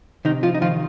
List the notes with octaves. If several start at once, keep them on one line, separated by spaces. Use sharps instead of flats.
C3 D#3 D#4
F3 F4
D#4
D#3 F3 F4